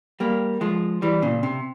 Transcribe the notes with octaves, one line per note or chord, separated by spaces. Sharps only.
G3 A#3
F3 G#3
E3 G3
A#2 C#3
C3